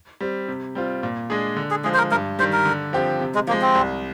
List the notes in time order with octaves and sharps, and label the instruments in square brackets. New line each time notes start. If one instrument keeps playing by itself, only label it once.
[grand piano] G3 C4
C3
G3 C4 F4
A#2
G#3 D4 G#4
D3
[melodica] G#4
[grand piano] F3 G#3 [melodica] G#4
[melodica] C5
A#4
[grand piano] G2 [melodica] A#4
[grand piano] D#3 G3 [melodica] C5
[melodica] A#4
[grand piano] D3
F3 C4 G4
C3
[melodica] G#3
[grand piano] F3 [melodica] A#3
[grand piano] G#3
[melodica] C4
[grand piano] C2